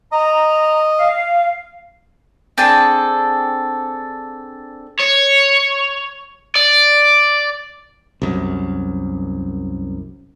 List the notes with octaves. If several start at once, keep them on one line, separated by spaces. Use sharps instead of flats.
D#5 A#5
F5
C4 D4 G#4 A4
C#5
D5
C2 F#2